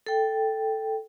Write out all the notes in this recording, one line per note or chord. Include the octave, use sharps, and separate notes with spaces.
A4 G5